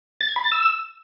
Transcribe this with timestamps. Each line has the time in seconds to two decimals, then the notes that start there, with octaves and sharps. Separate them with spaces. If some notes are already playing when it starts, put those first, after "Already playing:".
0.21 A6
0.28 G#6
0.36 B5
0.44 A6
0.52 E6